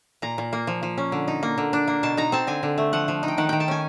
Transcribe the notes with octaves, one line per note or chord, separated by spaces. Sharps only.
A#2 A#5
A#2
A#3
F3
F3
C#4
D3
D#4
A#3
D3
D4
A#3
B2 A5
D#4 A#5
C4 A5
D3 G#5
D3
A3
F3 F#5
F3
D#4
G5
D#3 F#5
D#3 G5
A5
C#4 G#5